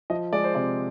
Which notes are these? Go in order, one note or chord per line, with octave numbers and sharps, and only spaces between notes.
F3 D#5
G#3 D5
C5
C3 D5